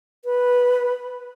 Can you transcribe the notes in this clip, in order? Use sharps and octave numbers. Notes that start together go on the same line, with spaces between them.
B4